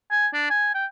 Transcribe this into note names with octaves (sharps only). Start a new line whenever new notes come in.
G#5
D4
G#5
G5